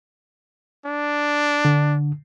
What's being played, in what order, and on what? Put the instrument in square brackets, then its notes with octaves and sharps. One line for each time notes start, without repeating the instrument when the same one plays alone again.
[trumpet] D4
[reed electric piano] D3